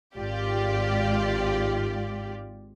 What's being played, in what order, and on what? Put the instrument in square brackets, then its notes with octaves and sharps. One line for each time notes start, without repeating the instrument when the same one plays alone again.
[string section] G#1 G#2 F4 G4 D5